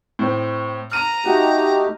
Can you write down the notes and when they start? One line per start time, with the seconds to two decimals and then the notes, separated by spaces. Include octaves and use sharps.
0.19 A2 C4
0.91 A#5 F6 D#7
1.25 A3 D#4 F#4 G4